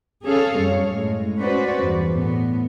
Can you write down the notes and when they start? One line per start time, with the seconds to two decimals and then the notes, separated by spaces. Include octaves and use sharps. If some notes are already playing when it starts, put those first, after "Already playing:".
0.24 C#4 G#4 A4 F5
0.59 F#2 G3 C#5
0.89 A2 G#3
1.39 C#4 F#4 B4 C5 D5
1.82 E2 G2
2.15 A2 B3